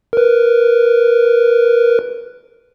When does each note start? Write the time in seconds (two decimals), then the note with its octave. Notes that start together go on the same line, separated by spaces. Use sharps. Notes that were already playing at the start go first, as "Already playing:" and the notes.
0.13 A#4 B4